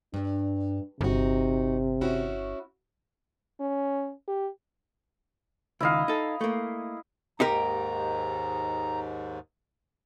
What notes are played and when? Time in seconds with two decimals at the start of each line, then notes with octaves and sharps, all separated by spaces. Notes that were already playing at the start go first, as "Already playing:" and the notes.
0.14 G2 D4
1.01 G1 C3 D#4 F#4
2.01 C#4 E4 F#4
3.60 C#4
4.28 G4
5.80 C#2 D#3 E4 D#5 F5
6.08 D#4 A4
6.41 A3 A#3
7.40 D#2 G#2 D#4 G4 A#4 A#5